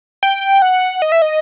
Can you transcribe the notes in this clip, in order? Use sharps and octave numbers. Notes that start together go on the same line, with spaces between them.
G5
F#5
D#5
E5
D#5